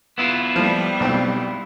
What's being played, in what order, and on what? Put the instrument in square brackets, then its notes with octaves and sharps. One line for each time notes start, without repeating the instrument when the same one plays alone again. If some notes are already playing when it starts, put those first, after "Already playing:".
[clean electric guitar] B3 E4 F4
[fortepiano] F3 [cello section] G3
[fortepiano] B1 C4